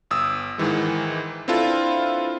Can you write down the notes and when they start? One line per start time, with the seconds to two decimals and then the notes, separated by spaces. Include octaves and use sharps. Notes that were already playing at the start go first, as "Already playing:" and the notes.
0.11 G1 D#6 E6
0.58 G#2 D#3 E3 G#3
1.48 C4 D4 E4 F4 A4 B4